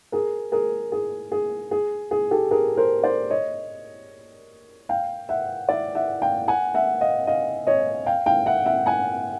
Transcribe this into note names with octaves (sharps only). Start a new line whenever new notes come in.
G#4 A#4
G#4 A#4
G#4
G#4
G#4
G#4
G4 A4
G#4 A#4
A#4 C5
C5 D5
C#5 D#5
F5 G5
E5 F#5
D5 E5
E5 F#5
F5 G5
F#5 G#5
E5 F#5
D#5 F5
D#5 F5
C#5 D#5
F5 G5
F5 G5
E5 F#5
E5 F#5
F#5 G#5